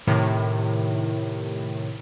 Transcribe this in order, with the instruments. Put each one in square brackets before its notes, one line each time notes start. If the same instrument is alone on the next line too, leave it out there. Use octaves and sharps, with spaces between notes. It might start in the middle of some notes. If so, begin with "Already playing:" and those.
[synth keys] A2 C3 D#3